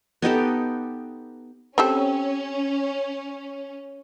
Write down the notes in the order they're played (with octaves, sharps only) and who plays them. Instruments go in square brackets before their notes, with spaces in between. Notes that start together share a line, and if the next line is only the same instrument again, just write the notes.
[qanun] B3 D#4 G4 A4
[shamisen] C4 G4 A4 [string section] C#4